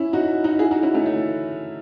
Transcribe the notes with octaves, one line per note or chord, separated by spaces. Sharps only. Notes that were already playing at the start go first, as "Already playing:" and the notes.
Already playing: C#4 E4
D#4 F#4
D#4 F#4
E4 G#4
D#4 F#4
C#4 E4
A3 C#4
A3